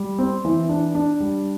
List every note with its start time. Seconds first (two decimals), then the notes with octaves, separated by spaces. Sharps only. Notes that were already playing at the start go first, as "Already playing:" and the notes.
Already playing: G3
0.19 C4
0.45 E3
0.69 D4
0.95 D4
1.20 G3